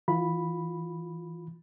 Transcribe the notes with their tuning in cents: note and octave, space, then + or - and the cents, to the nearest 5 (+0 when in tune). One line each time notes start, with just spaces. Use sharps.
E3 -5 F4 +20 B5 +0